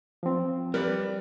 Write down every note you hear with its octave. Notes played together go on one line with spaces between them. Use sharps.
F3 C4
G3 A#4 B4 D5